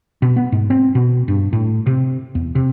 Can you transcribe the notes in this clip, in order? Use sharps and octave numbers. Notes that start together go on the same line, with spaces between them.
B2
B3
G#2
C4
B2
G2
A2
C3
E2
C3